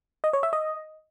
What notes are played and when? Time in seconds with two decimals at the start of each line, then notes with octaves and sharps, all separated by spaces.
0.24 D#5
0.33 C#5
0.43 E5
0.53 D#5